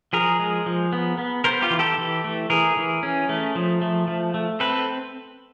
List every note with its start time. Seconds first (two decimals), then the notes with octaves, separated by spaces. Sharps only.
0.13 F3 G#4 A#4
0.39 G#3
0.66 F3
0.93 B3
1.18 B3
1.44 B3 A#4 C5
1.62 F4 G4
1.70 E3
1.79 G4 A4
1.98 E3
2.24 A3
2.50 E3 G#4 A#4
2.77 E3
3.03 C#4
3.29 A3
3.55 F3
3.81 A3
4.08 F3
4.34 A3
4.60 C4 A4 B4